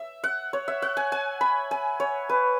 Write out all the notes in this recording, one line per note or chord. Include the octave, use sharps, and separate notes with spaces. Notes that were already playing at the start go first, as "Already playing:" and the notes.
Already playing: E5
F#5
C#5
E5
F#5
G#5
G#5
B5
G#5
C#5
B4